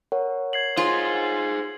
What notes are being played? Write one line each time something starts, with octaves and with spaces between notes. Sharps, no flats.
A#4 C#5 F#5
G#6 C7 F#7
F4 G#4 C5